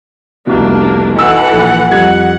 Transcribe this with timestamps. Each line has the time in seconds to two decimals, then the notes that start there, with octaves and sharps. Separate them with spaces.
0.47 F1 C2 B2 A#3 D4
1.16 B1 E3 A4 F#5 E6
1.53 A#1
1.91 F2 G3 F#5 G#6